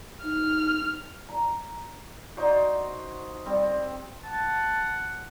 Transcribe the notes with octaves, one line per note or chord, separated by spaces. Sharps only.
D#4 F6
A#5
D#4 F#4 C5 D5
G3 C4
F#5 A5